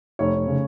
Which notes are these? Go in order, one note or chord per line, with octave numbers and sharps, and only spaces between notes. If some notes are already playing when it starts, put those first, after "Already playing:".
F1 C#5
F1
C#3